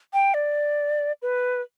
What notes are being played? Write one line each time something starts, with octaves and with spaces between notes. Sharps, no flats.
G5
D5
B4